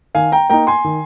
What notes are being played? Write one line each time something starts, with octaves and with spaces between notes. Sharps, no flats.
D#3 F5 G#5
G5 A#5
A#3 D#4 G5 A#5
G#5 C6
D#3